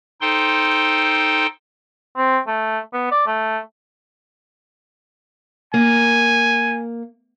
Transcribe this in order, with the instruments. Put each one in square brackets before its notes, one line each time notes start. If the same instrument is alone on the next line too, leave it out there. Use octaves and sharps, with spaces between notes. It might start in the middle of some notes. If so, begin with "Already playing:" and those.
[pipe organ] D#4 A4 C5 G5 C6
[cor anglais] C4
A3
B3
D5
A3
[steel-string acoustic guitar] A#3 [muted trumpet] G#5